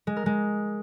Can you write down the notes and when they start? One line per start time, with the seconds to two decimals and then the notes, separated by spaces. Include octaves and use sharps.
0.07 G#3
0.17 A#4
0.26 G#3